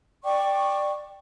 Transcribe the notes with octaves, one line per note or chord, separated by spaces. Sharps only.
D5 G5 C#6 D6